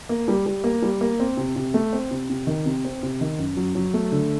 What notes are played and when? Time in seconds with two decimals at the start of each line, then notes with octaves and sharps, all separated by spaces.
0.09 A#3
0.28 G3
0.46 G3
0.64 A#3
0.82 G3
1.01 A#3
1.20 C4
1.37 C3
1.56 C3
1.74 A3
1.93 C4
2.11 C3
2.30 C3
2.47 D#3
2.66 C3
2.85 C4
3.03 C3
3.21 D#3
3.39 F#2
3.57 F#3
3.75 F#3
3.94 A3
4.12 D3